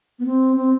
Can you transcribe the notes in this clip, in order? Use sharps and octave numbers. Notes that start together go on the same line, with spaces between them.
B3
C4
C4